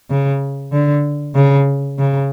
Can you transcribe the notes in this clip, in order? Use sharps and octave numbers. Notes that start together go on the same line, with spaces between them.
C#3
D3
C#3
C#3